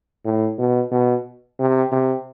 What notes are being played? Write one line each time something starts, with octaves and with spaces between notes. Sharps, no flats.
A2
B2
B2
C3
C3